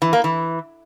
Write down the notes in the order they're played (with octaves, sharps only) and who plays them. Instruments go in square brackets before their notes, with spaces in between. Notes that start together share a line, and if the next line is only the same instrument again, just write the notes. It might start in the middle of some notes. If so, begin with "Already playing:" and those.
[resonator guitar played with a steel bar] E3
A#3
E3